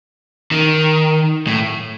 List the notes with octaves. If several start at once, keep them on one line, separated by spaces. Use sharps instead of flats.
D#3
A2